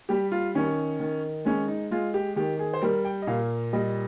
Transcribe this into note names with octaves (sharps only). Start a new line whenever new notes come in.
G3 G4
F4
D#3 C#4
D#3
G#3 C#4
D#4
G#3 F4
G4
D#3 G4
G#4
C5
G3 A#4
G5
D#5
A#2 F5
G3 D#5